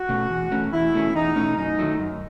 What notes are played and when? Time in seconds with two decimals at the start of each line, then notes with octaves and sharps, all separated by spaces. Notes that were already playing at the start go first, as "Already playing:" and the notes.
Already playing: F#4
0.09 B2 A3 C#4
0.30 E2
0.52 B2 A3 C#4
0.72 E2 E4
0.94 B2 A3 C#4
1.15 E2 D#4
1.36 B2 A3 C#4
1.57 F#2 D#4
1.79 D#3 F#3 A3
1.99 F#2